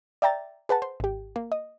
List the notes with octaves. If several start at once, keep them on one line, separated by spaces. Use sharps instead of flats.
D5 E5 G5 A#5 A6
G#4 B4 F#5 A5
C5
G#1 G4
A#3
D#5